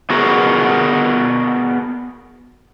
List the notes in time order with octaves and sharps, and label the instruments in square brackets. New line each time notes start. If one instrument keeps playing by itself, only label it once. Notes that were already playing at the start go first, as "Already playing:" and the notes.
[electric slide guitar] B3 F#4 G#4 A#4